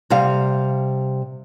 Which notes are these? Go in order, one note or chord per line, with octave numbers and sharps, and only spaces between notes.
C3 G3 F5